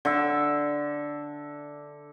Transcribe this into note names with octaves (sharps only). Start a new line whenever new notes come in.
D3 E5